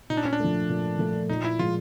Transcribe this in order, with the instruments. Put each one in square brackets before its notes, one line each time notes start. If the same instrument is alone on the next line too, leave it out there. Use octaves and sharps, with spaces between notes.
[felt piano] A#2 [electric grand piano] D#4
[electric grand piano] D4
C#4
D4
[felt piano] F3 A3
A#2
F3 A3
[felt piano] A#2 [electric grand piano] D#4
[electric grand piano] E4
[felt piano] F3 G#3 [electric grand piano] F4